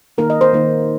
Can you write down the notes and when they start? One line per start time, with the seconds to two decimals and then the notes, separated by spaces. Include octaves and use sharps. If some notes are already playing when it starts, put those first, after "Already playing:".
0.18 D#3 A#3 D#4 A#4
0.30 D#5
0.41 C5
0.53 D#3 A#3 D#4